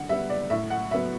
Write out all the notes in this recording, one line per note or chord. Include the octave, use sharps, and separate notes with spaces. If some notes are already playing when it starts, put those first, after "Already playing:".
Already playing: D3 F#5
G3 B3 E5
D5
A2 E5
F#5
F#3 B3 E5